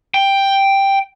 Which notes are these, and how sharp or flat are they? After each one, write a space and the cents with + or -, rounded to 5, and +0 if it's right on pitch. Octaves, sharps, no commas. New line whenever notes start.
G5 +5